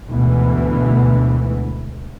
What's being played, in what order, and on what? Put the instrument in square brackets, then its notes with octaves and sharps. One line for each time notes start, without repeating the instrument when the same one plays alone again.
[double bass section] D2 G#2 B2 E3